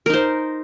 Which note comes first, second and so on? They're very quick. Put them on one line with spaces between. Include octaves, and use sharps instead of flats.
A#4 D#4 C5